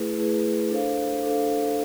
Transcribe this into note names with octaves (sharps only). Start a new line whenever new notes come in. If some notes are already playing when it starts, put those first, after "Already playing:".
Already playing: A3 E4 G#4 B4
A3 E4 G#4 B4
D4 A4 C5 F5
D4 A4 C5 F5